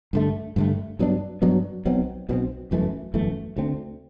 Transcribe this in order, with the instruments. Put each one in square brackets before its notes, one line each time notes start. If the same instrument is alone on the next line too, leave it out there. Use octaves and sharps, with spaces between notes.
[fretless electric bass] G2 D3 A3
G2 D3 A3
G2 F#3 B3 D4
G2 F#3 B3 D4
B1 B2 F#3 C4
B1 B2 F#3 C4
G1 F#2 E3 A3
G1 F#2 E3 A3
D2 D3 A3 C4